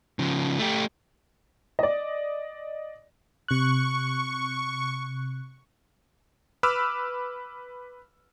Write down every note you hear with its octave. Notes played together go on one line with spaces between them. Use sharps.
C#3 F3
A3 G4
D5 D#5
C3 C#6 F#6
B4 B5 D6 E6 F6